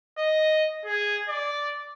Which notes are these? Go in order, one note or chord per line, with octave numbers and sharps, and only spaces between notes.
D#5
G#4
D5